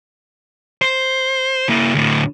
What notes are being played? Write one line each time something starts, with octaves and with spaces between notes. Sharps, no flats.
C5
A#3 E4
D2 A2